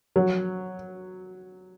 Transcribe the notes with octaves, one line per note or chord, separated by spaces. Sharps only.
F#3